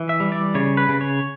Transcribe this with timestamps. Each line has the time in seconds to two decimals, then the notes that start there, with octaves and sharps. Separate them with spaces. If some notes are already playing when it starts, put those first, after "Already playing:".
Already playing: E3
0.09 E5
0.20 G3
0.32 D5
0.55 C#3 C#5
0.77 B4
0.89 C#3
1.01 C#5